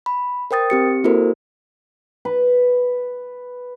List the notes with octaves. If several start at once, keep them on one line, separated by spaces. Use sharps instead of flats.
B5
A#4 C5 G5 D#6 A6
C4 G4 C#7
A#3 E4 F#4 A4 A#4 C5
B4